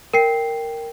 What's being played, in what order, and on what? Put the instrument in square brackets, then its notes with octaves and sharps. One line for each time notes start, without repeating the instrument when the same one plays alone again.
[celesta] A#4 G5 C7